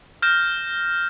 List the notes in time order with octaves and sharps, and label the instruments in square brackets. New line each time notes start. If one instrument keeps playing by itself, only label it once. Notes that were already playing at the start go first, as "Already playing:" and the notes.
[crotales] F6 G6 A#6 E7